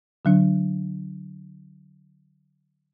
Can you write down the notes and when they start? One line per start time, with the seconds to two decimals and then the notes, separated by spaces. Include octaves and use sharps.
0.25 D3 F#3 D4